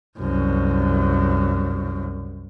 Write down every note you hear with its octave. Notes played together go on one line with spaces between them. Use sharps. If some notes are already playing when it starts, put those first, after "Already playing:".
C2 F#2